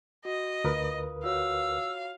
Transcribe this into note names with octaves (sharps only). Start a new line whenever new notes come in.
F#4 D#5
D2 F4 A#4 B4 D#6
F4 F#4 C#5 F5 E6